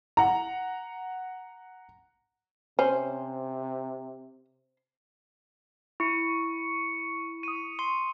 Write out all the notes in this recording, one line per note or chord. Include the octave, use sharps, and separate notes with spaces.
F#5 A#5
C3 C#4 C5
E4 C#6 C#7
D#6 D#7
C6